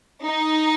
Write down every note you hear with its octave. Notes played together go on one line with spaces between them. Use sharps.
D#4